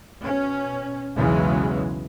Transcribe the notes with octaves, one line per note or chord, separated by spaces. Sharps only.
B2 C#4
B1 E2 C#3 E3 F#3 G#3